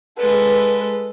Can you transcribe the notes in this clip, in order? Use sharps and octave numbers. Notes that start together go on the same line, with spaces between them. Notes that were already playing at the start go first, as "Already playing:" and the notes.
G#3 A4 B4